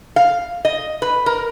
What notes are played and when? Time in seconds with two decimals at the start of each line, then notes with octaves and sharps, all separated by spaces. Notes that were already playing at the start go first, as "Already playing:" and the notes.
0.16 F5
0.65 D#5
1.02 B4
1.26 A#4